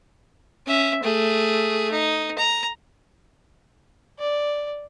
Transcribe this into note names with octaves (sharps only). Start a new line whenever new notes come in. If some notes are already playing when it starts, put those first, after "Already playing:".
C#4 E5
A3 G#4
D#4
A#5
D5